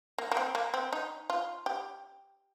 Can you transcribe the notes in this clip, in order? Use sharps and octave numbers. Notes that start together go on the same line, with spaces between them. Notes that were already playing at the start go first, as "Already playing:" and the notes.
A#3
A#3
C4
A#3
C4
D#4
F4
G4